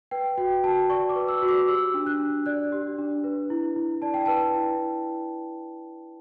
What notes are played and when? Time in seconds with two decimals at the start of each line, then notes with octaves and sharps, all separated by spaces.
0.11 B4 G5
0.37 F#4 G5
0.64 F#4 A5
0.90 D5 C#6
1.09 D6
1.16 B4
1.28 E6
1.42 F#4
1.48 D6
1.68 G4 E6
1.94 D4
2.06 F#6
2.19 D4
2.46 D5 F#6
2.72 G4
2.98 D4
3.24 B4
3.50 E4
3.76 E4
4.02 D5 A5
4.14 G5
4.26 B4 A5
4.55 E4